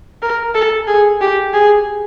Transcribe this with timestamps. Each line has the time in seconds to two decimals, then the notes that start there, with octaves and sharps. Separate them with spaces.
0.22 A#4
0.55 A4
0.87 G#4
1.21 G4
1.54 G#4